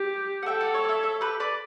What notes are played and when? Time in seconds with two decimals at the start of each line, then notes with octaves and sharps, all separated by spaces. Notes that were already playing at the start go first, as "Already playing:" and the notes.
Already playing: G4
0.43 F#5
0.46 A4 E5 G5
0.61 D5 F#5
0.74 C#5 E5
0.84 D5
0.88 C#5 E5
1.03 C#5 E5
1.21 G4 B4
1.40 B4 D5